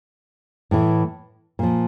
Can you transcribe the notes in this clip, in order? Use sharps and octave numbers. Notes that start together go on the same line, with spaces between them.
A2 E3
A#2 F3